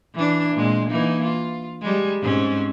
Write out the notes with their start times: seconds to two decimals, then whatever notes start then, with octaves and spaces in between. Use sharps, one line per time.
0.14 E3 D4
0.55 A#2 G#3 C4
0.87 E3 A#3 D#4
1.23 F4
1.82 G3 G#3
2.22 G#2 C4 C#4